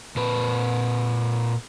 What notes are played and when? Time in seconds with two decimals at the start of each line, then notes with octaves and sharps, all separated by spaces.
0.16 A#2 B4